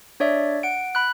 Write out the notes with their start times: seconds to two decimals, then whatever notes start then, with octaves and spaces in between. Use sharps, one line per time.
0.20 D4 C#5 D5 E5
0.63 F#5 D7
0.95 B5 F#6